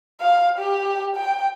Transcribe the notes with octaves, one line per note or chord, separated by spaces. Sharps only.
F5
G4
G5